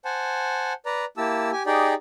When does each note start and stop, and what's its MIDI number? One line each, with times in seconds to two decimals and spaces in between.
0.05 0.73 72
0.05 0.73 78
0.05 0.73 80
0.05 0.73 81
0.86 1.05 71
0.86 1.05 74
0.86 1.05 82
1.17 1.51 58
1.17 1.51 64
1.17 1.51 67
1.17 1.51 81
1.17 1.51 88
1.53 1.63 67
1.53 1.63 80
1.66 1.94 63
1.66 1.94 67
1.66 1.94 68
1.66 1.94 74
1.66 1.94 79